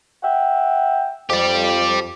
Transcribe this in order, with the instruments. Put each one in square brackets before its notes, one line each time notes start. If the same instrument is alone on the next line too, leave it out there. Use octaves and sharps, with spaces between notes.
[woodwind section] E5 F#5 G5
[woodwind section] F2 [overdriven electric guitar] G4 D5